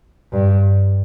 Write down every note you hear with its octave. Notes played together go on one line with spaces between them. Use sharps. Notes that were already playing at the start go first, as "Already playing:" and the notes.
G2